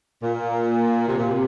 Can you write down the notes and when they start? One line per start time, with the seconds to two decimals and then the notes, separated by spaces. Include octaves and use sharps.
0.23 A#2
1.08 C3
1.19 A#2
1.29 C3